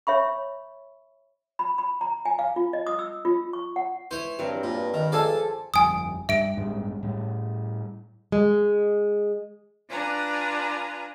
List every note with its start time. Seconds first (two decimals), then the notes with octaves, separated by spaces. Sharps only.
0.07 C#5 E5 B5 C#6
1.59 B5
1.78 B5
2.01 A#5
2.25 G#5
2.39 F5
2.56 F4
2.73 D#5
2.87 D#6
2.99 E6
3.25 F4
3.53 C#6
3.76 F#5
4.11 E3 C5 C#5
4.39 G2 F#3 C4 A#4
4.64 A#2
4.94 D#3
5.12 F3 F4 G#4 A4 D5 G#5 A5
5.74 G1 F2 G#5 D#6
6.29 G2 E5 D7
6.57 A1 G2 G#3
7.03 A2 G3
8.32 G#3
9.90 D4 F4 B4 G#5 A#5